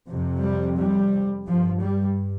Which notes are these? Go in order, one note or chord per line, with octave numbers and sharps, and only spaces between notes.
F2 C3
G3
G3
G2 F3
G3